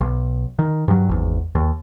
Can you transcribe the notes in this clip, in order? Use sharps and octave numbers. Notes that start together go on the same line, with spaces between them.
B1
D#3
G2 F#3
G#1 E2
D#2